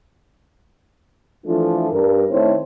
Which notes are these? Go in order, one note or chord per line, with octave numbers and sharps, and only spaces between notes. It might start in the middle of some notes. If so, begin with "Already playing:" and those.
E3 F3 A3 D4 F4 A4
G2 A#4
D#3 A3 C4 E4 C5 C#5